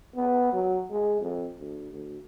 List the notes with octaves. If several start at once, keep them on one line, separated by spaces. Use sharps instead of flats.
B3
F#3
G#3
F2
D2
D2